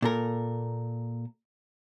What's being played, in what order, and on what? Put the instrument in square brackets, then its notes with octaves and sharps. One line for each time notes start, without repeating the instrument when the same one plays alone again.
[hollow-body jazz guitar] A#2 A4 A#4